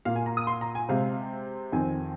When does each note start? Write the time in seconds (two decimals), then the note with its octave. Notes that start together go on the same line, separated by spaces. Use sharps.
0.05 A#2 A#3 F5
0.16 G#5
0.26 A#5
0.37 D#6
0.47 C6
0.61 A#5
0.75 G#5
0.89 C3 G#3 C4 F5
1.72 F2 D#3 C4 G#5